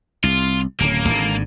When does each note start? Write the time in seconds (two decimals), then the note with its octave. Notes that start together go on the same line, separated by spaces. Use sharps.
0.24 C2 F4
0.80 D1 C#3 A#3
1.08 G#1 G#2 D3